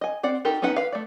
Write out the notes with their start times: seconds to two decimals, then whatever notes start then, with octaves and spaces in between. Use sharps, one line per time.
0.01 D#5 G#5
0.23 C4 D5 F#5
0.45 D#4 F#4 G4 A4 A#4
0.62 B3 C#4 D#4 B4 F#5
0.76 B4 F5
0.92 A3 D5